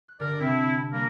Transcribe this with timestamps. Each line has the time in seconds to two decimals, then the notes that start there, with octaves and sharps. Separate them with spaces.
0.08 F#6
0.20 G1 D3 A#4 D5
0.40 C3 C4 E4 A5
0.93 G3 A#3 A#4